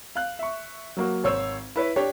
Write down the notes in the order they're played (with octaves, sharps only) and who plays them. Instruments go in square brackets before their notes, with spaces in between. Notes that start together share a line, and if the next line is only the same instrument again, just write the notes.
[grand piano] F5 F#6
E5 C#6
F#3 A#3 F#4
G#1 C5 C#5 E6
E4 B4 C#5
D4 G4 C#5